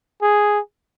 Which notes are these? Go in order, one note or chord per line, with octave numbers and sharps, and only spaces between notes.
G#4